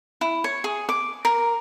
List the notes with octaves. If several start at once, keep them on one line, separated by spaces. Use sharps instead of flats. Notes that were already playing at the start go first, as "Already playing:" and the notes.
E4
C#5
G#4
D6
A#4